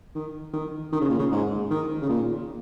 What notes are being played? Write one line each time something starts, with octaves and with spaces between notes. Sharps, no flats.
D#3
D#3
D#3
C#3
A#2
C#3
G#2
D#3
C#3
A#2